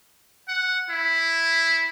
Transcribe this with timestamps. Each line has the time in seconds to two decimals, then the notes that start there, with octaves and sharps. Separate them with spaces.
0.48 F#5
0.90 E4